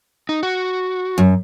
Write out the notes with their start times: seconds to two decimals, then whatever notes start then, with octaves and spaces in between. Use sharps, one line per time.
0.29 D#4
0.43 F#4
1.18 F#2